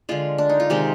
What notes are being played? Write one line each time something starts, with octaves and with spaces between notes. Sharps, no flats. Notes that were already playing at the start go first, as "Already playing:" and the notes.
D3 G#3 F4
D4
D#4
F4
C3 D#3 G#3 G4